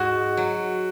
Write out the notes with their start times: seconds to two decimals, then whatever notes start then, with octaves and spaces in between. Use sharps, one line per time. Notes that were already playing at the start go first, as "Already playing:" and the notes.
Already playing: G#2 F#4
0.37 F#3